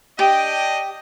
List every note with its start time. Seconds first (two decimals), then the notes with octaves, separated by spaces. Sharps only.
0.19 D4 G4 D#5 G5